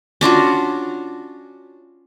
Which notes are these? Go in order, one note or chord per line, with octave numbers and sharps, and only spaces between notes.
C#4 D4 F4 F#4